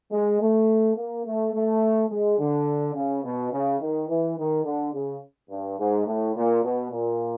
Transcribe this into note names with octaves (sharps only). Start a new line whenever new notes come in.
G#3
A3
A#3
A3
A3
G#3
D3
C#3
B2
C#3
D#3
E3
D#3
D3
C#3
G2
G#2
A2
A#2
B2
A#2